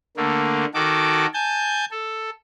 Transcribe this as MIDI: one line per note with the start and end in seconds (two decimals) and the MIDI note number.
0.17 0.65 50
0.17 0.65 57
0.17 0.65 58
0.74 1.26 51
0.74 1.26 66
0.74 1.26 69
0.74 1.26 86
1.34 1.85 80
1.34 1.85 81
1.34 1.85 91
1.91 2.30 69